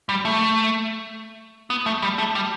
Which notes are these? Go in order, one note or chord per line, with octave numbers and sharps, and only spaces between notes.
G3
A3
B3
A3
G3
A3
G3